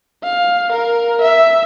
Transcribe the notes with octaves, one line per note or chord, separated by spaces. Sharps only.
F5
A#4
E5